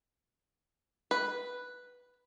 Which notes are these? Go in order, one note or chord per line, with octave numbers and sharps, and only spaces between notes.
B4